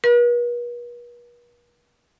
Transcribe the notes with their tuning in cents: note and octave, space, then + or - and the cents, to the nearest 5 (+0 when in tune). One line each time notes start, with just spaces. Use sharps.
B4 -45